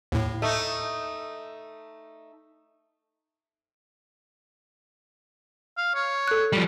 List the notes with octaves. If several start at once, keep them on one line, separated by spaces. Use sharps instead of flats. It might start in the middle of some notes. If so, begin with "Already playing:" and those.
D#2 A2
A3 D#4
F5
C#5
A4 F#6
F3 G3